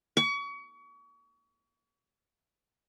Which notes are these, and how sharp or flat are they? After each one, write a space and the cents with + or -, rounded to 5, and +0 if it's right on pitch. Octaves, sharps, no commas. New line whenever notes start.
C#6 +35